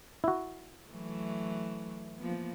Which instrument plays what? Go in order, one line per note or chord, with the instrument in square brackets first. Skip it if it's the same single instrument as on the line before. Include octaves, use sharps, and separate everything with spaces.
[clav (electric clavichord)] E4 F#4
[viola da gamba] E3 F#3 A3
F3 A#3 B3